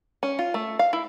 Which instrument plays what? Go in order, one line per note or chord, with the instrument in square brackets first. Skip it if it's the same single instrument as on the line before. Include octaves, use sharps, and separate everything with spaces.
[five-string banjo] C#4
F4
A3
F5
E4